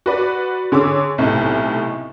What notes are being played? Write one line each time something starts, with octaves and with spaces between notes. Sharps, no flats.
F#4 B4 D5
D3 G#4 C#5 D6 E6
B1 A2 C3